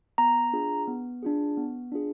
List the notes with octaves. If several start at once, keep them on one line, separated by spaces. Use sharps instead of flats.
B3 A#5
D4 F4 G#4
B3
D4 F4 G#4
B3
D4 F4 G#4